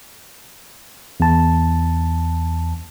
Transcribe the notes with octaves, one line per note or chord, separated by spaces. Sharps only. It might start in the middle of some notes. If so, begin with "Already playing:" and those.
E2 A5